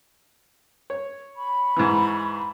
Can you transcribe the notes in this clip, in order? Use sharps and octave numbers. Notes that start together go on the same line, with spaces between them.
C#5
B5 C#6
G#2 E3